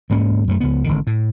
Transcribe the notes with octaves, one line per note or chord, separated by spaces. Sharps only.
D2 G#2 A#3 C#4
F#2 F#3 A3
C#2 B3
G#1 D3 D#3
A2